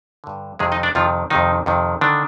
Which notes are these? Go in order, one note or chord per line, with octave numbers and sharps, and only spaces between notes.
G2 D3
F2 C3 D#3 G#3 G#4
D#4 D#5
D4 D5
F2 C3 D#3 F3 F4
F2 C3 D#3 D#4
F2 C3 D#3
D3 D#3 D4